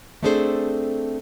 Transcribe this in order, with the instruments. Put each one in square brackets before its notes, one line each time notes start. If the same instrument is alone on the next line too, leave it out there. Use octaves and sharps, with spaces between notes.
[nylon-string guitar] A3 C4 D4 G#4 A4 C5